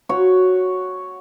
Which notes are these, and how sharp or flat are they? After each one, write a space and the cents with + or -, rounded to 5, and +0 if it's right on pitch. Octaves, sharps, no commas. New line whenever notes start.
F#4 +0 C#5 +0